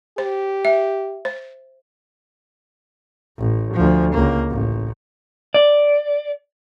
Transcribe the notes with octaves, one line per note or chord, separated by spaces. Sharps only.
G4 C5
E5
C5
A1
D2 F3
C#2 A#3
A1
D5